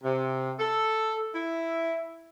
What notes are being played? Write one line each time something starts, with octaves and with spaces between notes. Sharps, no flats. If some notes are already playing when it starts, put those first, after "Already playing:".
C3
A4
E4